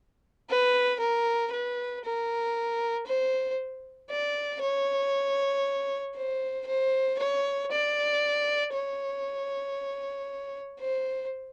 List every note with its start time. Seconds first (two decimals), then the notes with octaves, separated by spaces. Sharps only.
0.49 B4
1.00 A#4
1.52 B4
2.04 A#4
3.07 C5
4.10 D5
4.61 C#5
6.15 C5
6.67 C5
7.19 C#5
7.71 D5
8.73 C#5
10.80 C5